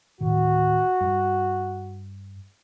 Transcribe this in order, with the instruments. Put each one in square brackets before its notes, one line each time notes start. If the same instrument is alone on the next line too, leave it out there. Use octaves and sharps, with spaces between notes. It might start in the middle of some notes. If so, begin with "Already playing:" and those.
[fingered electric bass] D1 A2 D#3 [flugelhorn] F#4
[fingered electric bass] G2